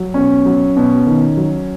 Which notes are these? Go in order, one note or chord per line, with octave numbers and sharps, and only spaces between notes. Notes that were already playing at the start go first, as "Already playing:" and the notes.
Already playing: F#3
B2 C#4
F#3
B2
D#3
F#3